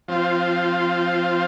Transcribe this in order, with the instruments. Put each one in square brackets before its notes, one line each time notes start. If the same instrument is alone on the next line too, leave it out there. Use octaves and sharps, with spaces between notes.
[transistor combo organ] F3 C4 F4